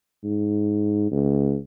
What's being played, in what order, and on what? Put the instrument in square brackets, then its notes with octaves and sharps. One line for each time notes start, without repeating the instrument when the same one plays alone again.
[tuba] G#2
C#2